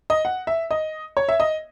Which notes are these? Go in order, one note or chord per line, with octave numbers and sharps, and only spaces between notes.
D#5
F#5
E5
D#5
C#5
E5
D#5